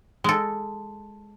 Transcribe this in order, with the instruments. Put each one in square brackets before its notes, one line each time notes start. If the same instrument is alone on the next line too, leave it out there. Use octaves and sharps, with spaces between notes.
[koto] G#3 A4